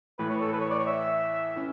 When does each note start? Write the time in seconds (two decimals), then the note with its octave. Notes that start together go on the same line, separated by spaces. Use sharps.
0.19 A2 E3 A3 B4
0.30 C#5
0.41 A4
0.53 B4
0.61 C#5
0.70 D5
0.79 C#5
0.87 E5
1.56 C#4 E4